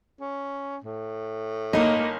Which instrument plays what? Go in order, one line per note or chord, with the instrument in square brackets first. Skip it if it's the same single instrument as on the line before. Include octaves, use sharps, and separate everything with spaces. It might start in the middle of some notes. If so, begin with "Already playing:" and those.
[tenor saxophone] C#4
A2
[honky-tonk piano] G1 D#4 [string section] A#3 [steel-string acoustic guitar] D#5